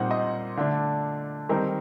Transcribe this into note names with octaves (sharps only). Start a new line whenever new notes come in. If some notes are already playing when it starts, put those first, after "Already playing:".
Already playing: A#2 G3 C4 D#4 F#5
D#5
D3 A3 D4
D#3 G3 C4 D#4 A#4